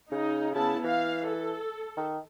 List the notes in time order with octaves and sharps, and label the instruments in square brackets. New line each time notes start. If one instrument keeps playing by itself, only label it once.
[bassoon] C#3 [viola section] D#4
[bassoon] C#3 [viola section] B3 E4 A5
[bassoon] E3 [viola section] F5
[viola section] A4
[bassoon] D#3